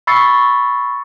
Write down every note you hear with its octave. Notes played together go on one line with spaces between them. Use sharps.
B5 C#6 E6 A6 C7 C#7